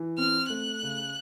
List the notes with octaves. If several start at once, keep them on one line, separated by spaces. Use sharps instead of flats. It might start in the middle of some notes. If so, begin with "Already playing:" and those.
Already playing: E3
C4 F6
A3 F#6
C#3